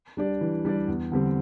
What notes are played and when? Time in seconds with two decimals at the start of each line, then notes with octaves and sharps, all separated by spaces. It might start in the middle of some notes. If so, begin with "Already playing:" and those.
0.17 G3 D4 G4 D5
0.41 E3
0.65 G3 D4 G4 D5
0.88 E2
1.12 D3 G3 C4 G4